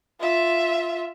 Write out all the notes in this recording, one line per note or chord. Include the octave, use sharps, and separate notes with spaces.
F4 E5